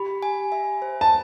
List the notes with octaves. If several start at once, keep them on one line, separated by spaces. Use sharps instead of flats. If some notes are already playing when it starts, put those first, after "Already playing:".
Already playing: G4 B5
G#5
E5
C5
A5